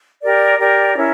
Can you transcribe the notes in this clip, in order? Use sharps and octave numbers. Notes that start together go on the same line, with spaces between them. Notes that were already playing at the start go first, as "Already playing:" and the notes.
G4 A#4 D5
G4 A#4 D5
C#4 E4 A#4